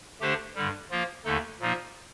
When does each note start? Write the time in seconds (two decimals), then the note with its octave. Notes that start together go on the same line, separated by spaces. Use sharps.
0.21 D3 A3 D4 G4 C5
0.55 G2 D3 G3
0.90 F3 A#3 F4
1.25 D#2 D3 A3 D#4 A4
1.60 A#2 F3 A#3 D#4